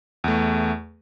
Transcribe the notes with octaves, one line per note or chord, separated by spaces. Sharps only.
E2 A3